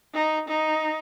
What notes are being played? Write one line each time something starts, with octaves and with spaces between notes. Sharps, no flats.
D#4
D#4